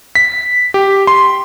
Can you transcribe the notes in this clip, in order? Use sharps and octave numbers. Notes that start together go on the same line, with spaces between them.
B6
G4
C6